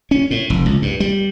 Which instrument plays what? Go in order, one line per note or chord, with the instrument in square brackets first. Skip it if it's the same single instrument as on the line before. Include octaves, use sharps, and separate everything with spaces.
[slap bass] C#4
A2
F1
C#2
G2
G3